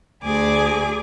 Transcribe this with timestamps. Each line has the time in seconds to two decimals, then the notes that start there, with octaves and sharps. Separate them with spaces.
0.23 D2 A3 G#4 D5 G#5 D6